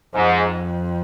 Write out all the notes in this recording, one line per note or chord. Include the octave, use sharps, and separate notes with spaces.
F2 G#2